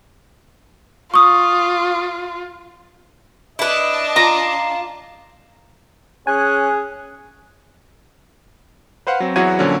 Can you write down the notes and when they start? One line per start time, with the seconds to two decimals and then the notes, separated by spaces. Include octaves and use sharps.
1.14 F4 C#6 D#6
3.59 D4 E4 B4 D#5 A5
4.16 F4 A#5
6.27 C#4 G#4 G#5 F#6
9.07 B4 C5 F5 F#5
9.20 F#3 C4
9.36 E2 F#3 E4 F#4 G#6 D#7
9.59 A#2 D3 F3 F#3 C#4